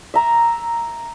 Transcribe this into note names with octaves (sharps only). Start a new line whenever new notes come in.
E5 A#5